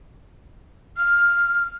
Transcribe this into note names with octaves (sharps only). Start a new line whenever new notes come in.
F6